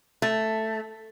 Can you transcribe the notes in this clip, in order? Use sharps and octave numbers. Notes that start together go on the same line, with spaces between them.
A3